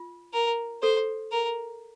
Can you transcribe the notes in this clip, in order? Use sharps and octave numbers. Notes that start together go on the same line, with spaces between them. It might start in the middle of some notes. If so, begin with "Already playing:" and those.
Already playing: F4
A#4
A4 C5
A#4